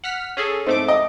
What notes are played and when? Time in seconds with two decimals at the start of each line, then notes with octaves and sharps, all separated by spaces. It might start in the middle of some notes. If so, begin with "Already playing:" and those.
0.04 F#5 F6 B6
0.37 C#4 G#4 A4
0.67 G#2 A3 C4 D6
0.88 D#5